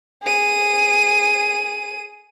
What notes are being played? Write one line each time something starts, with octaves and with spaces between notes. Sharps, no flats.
G#4 D#7